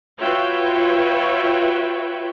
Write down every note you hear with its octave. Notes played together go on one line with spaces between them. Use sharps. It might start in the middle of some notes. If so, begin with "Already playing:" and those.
F4 F#4 B4 C#5 E5 G5